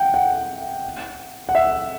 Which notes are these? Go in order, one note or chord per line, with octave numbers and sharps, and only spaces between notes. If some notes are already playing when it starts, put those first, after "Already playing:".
Already playing: F#5 G5
F#5
F#5
E5